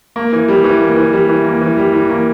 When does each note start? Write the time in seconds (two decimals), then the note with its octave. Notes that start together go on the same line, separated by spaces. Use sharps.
0.16 A#3
0.32 E3
0.48 G3
0.64 E3
0.80 A#3
0.96 E3
1.12 G3
1.28 E3
1.45 A#3
1.61 E3
1.77 G3
1.93 E3
2.09 A#3